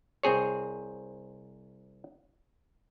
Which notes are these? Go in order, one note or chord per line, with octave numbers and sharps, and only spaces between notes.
C2 C4 G#4 C#5